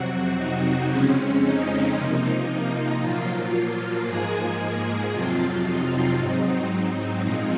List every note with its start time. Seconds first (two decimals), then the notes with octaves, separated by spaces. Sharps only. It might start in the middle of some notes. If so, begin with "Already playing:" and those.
Already playing: F2 C3 F#3 C4 F#4
0.37 D#4
0.89 F2 C#3 G#3 C4 C#4
1.43 D#4
1.96 C3 F3 A#3
3.01 A#2 F3 F#3 A#3 F4
4.07 G#2 F3 G#3 A#3 G#4
5.12 F2 C3 F3 F#3 C4 F4
5.65 D#4
6.18 G#2 F#3 C4
7.24 A#2 F3 G#3 C4 D#4